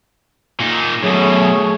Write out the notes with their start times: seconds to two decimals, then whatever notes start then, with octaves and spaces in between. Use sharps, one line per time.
0.60 A#2 D#4
1.03 F#2 B2 A3 G#4 C#5